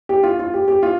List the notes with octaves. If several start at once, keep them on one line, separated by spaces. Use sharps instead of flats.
G4
F4
F4
G4
G4
F4